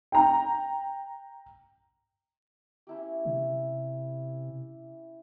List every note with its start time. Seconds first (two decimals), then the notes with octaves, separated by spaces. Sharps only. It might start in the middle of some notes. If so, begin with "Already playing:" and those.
0.12 G5 A#5
2.87 C#4 E4 G4
3.25 C3